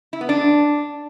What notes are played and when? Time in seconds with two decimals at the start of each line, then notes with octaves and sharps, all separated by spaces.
0.13 E4
0.21 B3
0.29 D4